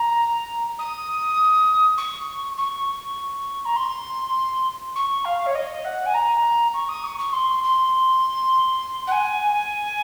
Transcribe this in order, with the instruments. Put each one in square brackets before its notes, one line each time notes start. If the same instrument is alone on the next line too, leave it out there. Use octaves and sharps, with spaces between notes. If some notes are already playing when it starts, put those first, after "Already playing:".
Already playing: [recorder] A#5
D#6
C#6
C#6
A#5
C6
C#6
F5
C#5
D#5
F#5
G#5
A#5
C#6
D#6
C#6
C#6
C6
C6
F#5
G#5